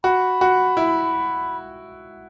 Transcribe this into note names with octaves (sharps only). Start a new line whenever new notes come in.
F#4 B5
F#4
E4